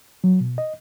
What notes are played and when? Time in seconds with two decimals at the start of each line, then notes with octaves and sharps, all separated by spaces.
0.24 F#3
0.41 B2
0.58 D#5